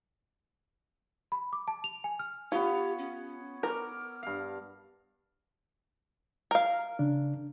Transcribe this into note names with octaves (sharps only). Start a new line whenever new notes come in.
B5
D6
A5
F7
G#5
F6
B3 F4 G4 C#5
C#4
A#4 D6 F6
G2 F5
A#4 F5
C#3 D4